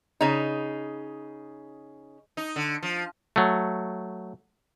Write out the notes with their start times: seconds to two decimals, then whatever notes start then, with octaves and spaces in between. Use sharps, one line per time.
0.21 C#3 D#4
2.37 D#4
2.56 D3
2.83 F3
3.36 F#3 A3